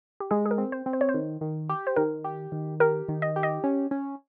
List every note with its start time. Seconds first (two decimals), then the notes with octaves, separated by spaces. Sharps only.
0.20 G4
0.31 G#3 G#4
0.46 G#4
0.51 A#4
0.58 C4
0.72 C5
0.86 C4
0.93 C5
1.01 C#5
1.09 C5
1.14 D#3
1.41 D#3
1.69 G4
1.87 C5
1.96 D#3 A#4
2.24 G4
2.52 D#3
2.80 G4 A#4
3.09 D#3
3.22 D#5
3.36 G4
3.43 D#5
3.64 C#4
3.91 C#4